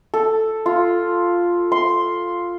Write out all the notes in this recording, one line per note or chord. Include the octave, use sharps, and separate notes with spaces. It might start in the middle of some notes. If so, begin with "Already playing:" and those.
A4
F4
C6